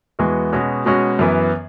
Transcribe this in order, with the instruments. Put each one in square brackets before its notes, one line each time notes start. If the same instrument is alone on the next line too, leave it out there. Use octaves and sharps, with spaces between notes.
[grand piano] E2 E3 G#3 B3 F#4
B2 G#3 C#4 F#4
B2 G#3 C#4 F#4
F#2 E3 B3